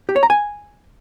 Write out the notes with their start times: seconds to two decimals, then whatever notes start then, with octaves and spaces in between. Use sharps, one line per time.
0.09 G4
0.16 C#5
0.23 A#5
0.30 G#5